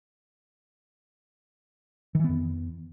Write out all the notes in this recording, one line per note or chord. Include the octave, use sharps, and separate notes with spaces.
F2 D#3 E3 B3